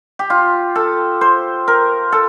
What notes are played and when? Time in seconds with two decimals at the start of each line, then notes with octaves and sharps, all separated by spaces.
0.19 G4
0.30 F4
0.75 A4
1.21 C5
1.68 A#4
2.12 A4